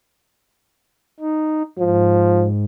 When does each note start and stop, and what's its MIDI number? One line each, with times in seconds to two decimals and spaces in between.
1.20 1.62 63
1.79 2.65 44
1.79 2.46 53